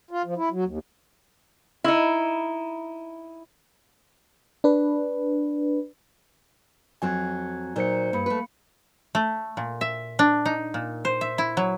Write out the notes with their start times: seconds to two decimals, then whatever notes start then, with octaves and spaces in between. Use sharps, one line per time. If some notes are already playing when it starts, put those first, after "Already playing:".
0.11 F4
0.25 F3
0.37 E4
0.51 F#3
0.65 D#2
1.84 D#4 E4
4.64 D4 B4
7.02 F2 F#3 C4 G#5 F#6 G#6
7.76 A#2 F#3 D#4 C5 C#7
8.13 G2 A#3 B5 C#7
8.26 A3 B4
9.15 A3
9.57 A#2
9.81 E5
10.19 D4
10.46 D#4
10.74 A#2
11.05 C5
11.21 E5
11.38 E4
11.57 F#3